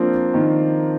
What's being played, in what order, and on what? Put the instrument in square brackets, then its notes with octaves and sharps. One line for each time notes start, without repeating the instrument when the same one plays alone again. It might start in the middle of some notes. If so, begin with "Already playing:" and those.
Already playing: [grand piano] F3 C4 F4 [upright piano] A#3 D4
[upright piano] D#3